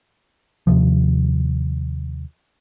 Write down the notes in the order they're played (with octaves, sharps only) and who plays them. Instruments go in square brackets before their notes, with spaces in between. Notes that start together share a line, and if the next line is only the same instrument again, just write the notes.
[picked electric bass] D#2 C3 F3